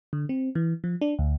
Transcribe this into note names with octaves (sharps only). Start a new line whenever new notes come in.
D3
C4
E3
F3
D4
D2